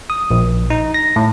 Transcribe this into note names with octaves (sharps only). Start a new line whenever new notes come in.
D#6
A#1
D#4
A#6
A2